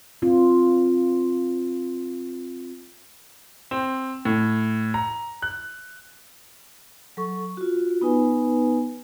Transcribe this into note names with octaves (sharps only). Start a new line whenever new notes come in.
C4 F4
C4
A2
A#5
F#6
F#3 A4 C#6
F4 F#4
B3 D#4 B4 G#5